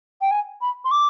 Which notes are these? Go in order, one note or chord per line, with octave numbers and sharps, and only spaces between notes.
G5
G#5
B5
C6
D6